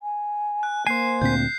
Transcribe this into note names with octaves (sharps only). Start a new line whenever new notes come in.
G#5
F#6
A#3 C5 G#5 C7
D2 A#2 C4 G6 B6